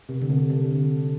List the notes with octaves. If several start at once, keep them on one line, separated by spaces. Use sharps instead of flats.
C3
D3
C3
C3
D3